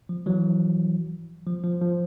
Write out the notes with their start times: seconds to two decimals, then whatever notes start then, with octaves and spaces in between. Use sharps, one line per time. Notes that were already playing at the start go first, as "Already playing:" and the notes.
0.09 F3
0.26 E3 F#3
1.47 F3
1.64 F3
1.81 F3